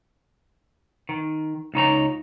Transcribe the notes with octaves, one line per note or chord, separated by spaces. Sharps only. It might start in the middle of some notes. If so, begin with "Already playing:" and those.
D#3
C#2 D#4 C#5 A#5